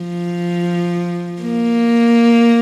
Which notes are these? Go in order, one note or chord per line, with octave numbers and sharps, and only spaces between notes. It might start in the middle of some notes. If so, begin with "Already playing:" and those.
Already playing: F3
A#3